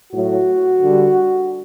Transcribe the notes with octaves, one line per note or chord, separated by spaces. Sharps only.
A2 F#3 A3 F#4
D3 G3